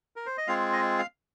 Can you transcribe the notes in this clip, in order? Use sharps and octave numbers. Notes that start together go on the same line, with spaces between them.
A#4
C5
D#5
G#3 C4 F4 G#4 F5
D#5
F5